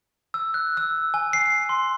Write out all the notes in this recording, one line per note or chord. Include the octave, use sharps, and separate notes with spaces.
E6
F#6
E6
G#5
C7
C6